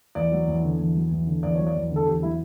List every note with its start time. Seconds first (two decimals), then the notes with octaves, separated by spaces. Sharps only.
0.15 E2 D5
0.32 F#3
0.47 E2
0.63 D3
0.79 E2
0.95 F#3
1.11 E2
1.27 D3
1.43 E2 D5
1.55 F#3 C#5
1.67 D5
1.75 E2
1.90 D3
1.96 A4
2.07 E2 G4
2.23 F#3 E4